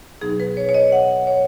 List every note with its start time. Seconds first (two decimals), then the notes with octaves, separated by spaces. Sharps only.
0.21 B2 F#3 B3 D#4 G#4
0.40 B4
0.57 C#5
0.69 C#5
0.74 D#5
0.92 F#5
1.27 C#5